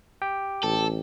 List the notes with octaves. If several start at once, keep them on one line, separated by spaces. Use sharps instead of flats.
G4 G5
A1 A4